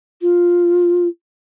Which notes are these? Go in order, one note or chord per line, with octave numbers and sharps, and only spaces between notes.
F4